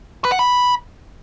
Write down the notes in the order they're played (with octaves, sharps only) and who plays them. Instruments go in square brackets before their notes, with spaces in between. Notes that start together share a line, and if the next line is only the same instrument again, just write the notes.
[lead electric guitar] B4
F#5
B5